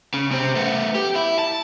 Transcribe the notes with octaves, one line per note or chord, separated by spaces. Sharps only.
C#3
C3 C4
A3 B3
G4
E4
A5